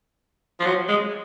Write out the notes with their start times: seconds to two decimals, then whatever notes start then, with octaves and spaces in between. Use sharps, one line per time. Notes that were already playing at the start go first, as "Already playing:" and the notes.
0.60 F3
0.66 F#3
0.88 G#3